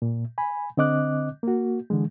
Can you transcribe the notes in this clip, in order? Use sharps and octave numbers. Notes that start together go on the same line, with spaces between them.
A#2
G#5 B5
D3 C4 D#5 D6 F#6
A#3 F#4
D3 E3 G#3